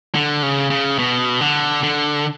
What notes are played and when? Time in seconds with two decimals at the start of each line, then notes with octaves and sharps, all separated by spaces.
0.15 D3
0.43 C#3
0.70 C#3
0.99 B2
1.41 D3
1.83 D3